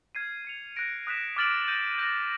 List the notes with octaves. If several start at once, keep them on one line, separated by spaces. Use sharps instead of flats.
F6 G#6 C7 D#7
G#6 C#7 F7
F#6 A#6 D7
D#6 F#6 B6 E7
D6 F6 A6 D7 F#7
G6 A#6 D#7
G6 A#6 D#7